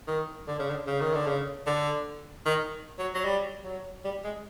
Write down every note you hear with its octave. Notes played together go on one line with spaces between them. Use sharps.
D#3
D3
C#3
D3
C#3
D#3
D3
C#3
D3
D#3
F#3
F#3
G3
F#3
G3
G#3